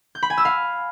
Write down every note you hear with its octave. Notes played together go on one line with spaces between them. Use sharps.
G6
B5
G#5
E6
F5